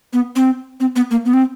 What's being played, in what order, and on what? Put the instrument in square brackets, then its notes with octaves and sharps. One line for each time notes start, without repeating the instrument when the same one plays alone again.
[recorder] B3
C4
C4
B3
A#3
B3
C4